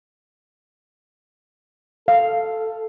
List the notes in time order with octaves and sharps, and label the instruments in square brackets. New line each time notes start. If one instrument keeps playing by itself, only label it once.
[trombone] A4 [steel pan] F5